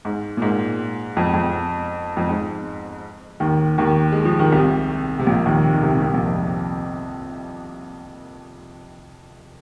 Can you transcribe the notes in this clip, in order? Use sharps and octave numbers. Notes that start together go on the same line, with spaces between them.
G#2
A#2
G#2
F2
F2
F2
G#2
D#2 D#3
D#2 D#3
G#3
F3
D#3
C2 C3
C3
A#1 A#2
D#2 D#3
C3
D#3
C2 C3
C2 C3
A#1 A#2
F2